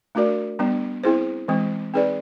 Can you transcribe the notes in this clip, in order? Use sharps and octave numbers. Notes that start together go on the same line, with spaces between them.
A3 D4 F#4 A#4 D5
G3 B3 D4
C4 E4 G#4 C5
E3 G#3 C4
C4 D#4 G#4 B4 D5